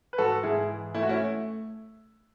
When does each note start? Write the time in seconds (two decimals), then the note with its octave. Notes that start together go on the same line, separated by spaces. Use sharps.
0.13 B4
0.18 G#2 F#4 A4
0.43 G#2 E4 G#4
0.69 E3
0.94 A3 E4
1.03 F#4
1.09 C#4 E4